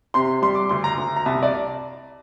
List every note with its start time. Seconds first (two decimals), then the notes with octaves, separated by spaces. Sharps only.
0.14 C3 C6
0.42 G3 C6
0.55 D6
0.69 D2 C6
0.84 A#5
0.98 D2
1.16 A#5
1.26 C2 A5
1.43 D5